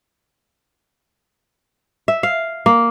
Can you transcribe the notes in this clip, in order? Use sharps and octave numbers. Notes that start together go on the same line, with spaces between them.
E5
F5
A#3